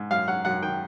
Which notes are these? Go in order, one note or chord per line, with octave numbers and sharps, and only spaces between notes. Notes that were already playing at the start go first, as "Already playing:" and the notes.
Already playing: G#2
F#2 F5
F#3 F#5
F#2 F#5
D#3 G5